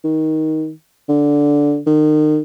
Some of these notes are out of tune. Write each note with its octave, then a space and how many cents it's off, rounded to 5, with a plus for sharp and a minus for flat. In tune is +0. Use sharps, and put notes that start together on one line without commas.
D#3 +15
D3 -10
D#3 -35